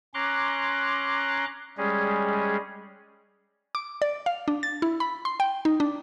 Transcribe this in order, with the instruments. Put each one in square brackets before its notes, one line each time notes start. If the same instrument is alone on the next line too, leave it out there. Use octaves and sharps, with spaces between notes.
[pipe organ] C#4 A#5 C6 D6 F#6
G3 G#3 C#4 G#4
[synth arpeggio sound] D6
D5
F5
D4
A6
E4
B5
C6
G5
D#4
D4